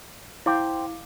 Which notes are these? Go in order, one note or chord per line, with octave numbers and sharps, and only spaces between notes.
E4 C5 F5 G5 D6